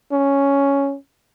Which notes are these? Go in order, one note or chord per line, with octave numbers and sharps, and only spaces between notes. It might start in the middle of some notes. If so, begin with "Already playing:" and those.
C#4